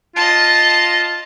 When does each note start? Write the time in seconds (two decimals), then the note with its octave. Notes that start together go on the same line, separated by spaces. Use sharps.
0.16 F4 D#5 A5